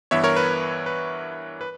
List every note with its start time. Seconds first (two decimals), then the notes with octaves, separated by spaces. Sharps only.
0.11 G2 E3 B3 C#5 E5
0.24 A#4 C#5
0.36 B4
0.86 B4
1.61 B4